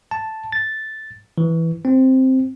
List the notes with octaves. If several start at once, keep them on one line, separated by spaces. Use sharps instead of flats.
A5
A6
E3
C4